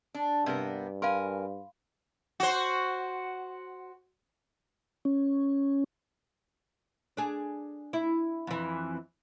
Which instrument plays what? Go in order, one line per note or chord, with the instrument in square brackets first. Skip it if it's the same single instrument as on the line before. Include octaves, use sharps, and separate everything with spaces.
[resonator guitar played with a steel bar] D4
[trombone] G2 [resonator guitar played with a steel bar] C3 B3 A#4
[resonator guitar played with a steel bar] A#4 G#5 [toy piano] F5 B5 C6
[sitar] F#4 C5
[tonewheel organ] C#4
[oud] D4 G#4
E4
F2 E3